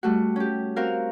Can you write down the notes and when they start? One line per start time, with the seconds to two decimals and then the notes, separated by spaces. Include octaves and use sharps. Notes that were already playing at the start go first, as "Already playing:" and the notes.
0.03 G3 A3 F#4
0.36 C#4 G4
0.76 C4 F#4 A#4 F5